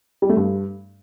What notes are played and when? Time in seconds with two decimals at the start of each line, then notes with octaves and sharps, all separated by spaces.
0.22 G3
0.29 A3
0.37 G2